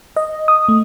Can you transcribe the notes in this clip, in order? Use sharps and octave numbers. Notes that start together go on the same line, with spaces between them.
D#5
D#6
A3